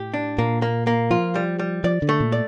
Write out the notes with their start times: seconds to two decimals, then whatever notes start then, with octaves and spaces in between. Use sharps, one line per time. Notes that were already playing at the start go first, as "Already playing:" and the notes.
Already playing: A2 G4
0.14 D4
0.38 A#2 A#3
0.62 A#3
0.87 A#3
1.10 F3 F4
1.35 G3
1.59 G3
1.84 F3 D5
2.02 D3
2.09 A3
2.20 A#2
2.32 D5